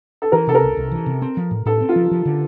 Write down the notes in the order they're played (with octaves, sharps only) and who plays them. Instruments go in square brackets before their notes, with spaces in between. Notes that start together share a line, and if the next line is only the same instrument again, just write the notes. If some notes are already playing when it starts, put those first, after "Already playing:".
[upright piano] A4
[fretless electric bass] E3 [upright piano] A#4
[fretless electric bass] C3 [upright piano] A4
[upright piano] A#4
[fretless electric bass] C2
C2
E3
C3
C4
F3
A2
[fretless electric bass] A2 [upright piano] A4
[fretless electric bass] C4
[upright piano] F4
[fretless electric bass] F3
F3
D3